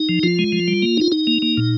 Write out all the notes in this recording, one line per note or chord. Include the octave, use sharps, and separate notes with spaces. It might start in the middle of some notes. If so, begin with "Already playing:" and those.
Already playing: D#4
F3
F3 F4
G#3
F3
G3
A#3
D#4 F4
D#4
A#3
A#3
A#2